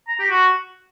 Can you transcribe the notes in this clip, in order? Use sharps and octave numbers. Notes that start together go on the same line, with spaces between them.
A#5
G4
F#4